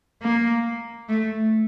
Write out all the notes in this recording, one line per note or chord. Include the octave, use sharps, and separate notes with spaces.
A#3
A3